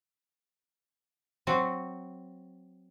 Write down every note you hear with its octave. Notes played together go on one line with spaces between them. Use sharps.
F#3 C4 F#4